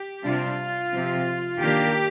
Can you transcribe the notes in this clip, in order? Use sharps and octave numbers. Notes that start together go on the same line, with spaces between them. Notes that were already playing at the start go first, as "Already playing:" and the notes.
Already playing: G4
C3 G3 D4 F4
C3 F3 C4
D#3 A#3 D4 G4